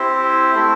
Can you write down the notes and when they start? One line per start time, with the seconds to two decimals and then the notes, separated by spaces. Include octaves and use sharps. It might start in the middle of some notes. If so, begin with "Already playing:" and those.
Already playing: C4 E4 G4 C5
0.55 A3 C4 E4